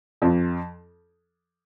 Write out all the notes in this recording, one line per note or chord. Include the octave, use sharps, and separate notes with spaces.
F2 F3